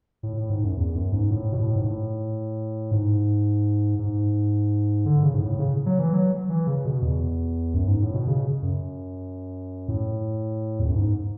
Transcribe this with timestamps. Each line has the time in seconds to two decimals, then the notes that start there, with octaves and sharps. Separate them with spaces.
0.23 A2
0.37 A2
0.50 G#2
0.64 F#2
0.77 E2
0.95 F#2
1.12 G#2
1.31 A2
1.52 B2
1.58 A2
1.76 G#2
1.85 A2
2.91 G#2
3.99 G#2
5.06 D3
5.23 C#3
5.34 G#2
5.42 A2
5.59 C#3
5.86 F#3
5.99 E3
6.13 F#3
6.49 E3
6.67 C#3
6.85 B2
7.02 E2
7.74 F#2
7.87 G#2
8.02 A2
8.14 B2
8.27 C#3
8.62 F#2
9.88 A2
10.79 E2
10.87 F#2
10.95 G#2